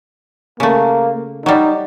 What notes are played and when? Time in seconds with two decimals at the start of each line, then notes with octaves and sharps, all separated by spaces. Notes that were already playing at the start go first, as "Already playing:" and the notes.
0.60 C#3 A3 A#3
1.46 F#3 G3 D#4